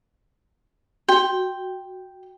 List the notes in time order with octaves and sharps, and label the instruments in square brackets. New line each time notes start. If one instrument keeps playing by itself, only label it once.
[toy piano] F#4 [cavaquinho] G5